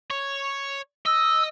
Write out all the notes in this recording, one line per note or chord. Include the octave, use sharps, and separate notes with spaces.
C#5
D#5 E6